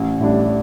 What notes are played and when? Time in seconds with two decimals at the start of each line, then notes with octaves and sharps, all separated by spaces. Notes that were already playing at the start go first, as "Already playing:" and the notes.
Already playing: A1
0.20 A2 G3 D4